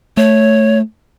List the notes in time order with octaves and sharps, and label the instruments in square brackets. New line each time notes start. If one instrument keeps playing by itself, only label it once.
[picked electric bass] A3 [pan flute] C#5